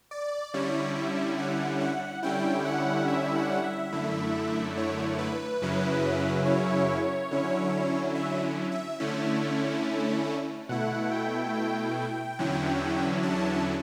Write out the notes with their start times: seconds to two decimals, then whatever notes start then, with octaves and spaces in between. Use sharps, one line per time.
0.11 D5
0.54 D3 G3 C#4 E4 C#5
0.96 E5
1.38 F#5
1.81 F#5
2.23 D3 G3 C#4 E4 G5
2.65 F#5
3.08 E5
3.36 F#5
3.64 E5
3.92 F#2 D3 A3 E4
4.77 C#5
5.19 B4
5.62 F#2 C#3 F#3 C#4 E4
6.46 C#5
7.31 D3 F#3 C#4 E4
8.15 E5
8.72 E5
9.00 D3 A3 C#4 E4
10.69 B2 A3 E4 F#5
11.11 G5
11.54 G5
12.39 E2 D3 F#3 C#4 E4
13.23 A5